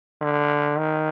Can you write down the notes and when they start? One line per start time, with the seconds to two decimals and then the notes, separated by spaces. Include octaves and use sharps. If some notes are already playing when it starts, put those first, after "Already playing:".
0.21 D3
0.78 D#3